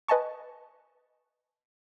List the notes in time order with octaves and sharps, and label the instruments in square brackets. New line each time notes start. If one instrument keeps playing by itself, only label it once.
[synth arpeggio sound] B4 D#5 G#5 A5 C#6